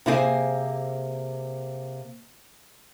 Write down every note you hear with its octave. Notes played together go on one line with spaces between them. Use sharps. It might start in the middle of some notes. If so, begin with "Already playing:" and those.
C3 A#3 E4 G#4 C5 G#5